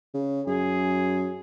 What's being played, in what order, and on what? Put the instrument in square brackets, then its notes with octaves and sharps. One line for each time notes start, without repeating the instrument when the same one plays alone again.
[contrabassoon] C#3
[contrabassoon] F#2 [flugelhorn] G#4